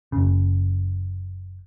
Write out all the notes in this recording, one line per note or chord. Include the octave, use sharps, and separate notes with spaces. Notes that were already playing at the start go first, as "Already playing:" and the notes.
F#1 C#3